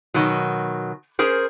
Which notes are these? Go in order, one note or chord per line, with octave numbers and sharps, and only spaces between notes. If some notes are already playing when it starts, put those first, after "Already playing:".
B2 D#3 F#3
C#4 G#4 A#4 C5